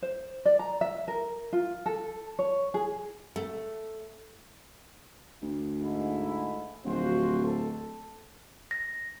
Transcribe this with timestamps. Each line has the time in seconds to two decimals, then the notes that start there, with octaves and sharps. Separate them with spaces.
0.02 C5
0.45 D5
0.59 A#5
0.81 E5
1.08 A#4
1.53 F4
1.86 A4
2.39 C#5
2.74 G#4
3.36 A3
5.42 D2
5.80 G#2 A3 E4
6.85 D1 F3 F#4 C5
7.44 A4
8.71 A#6